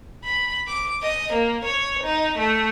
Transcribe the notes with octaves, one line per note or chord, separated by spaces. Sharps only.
B5
D6
D#5
A#3
C#5
D#4
A3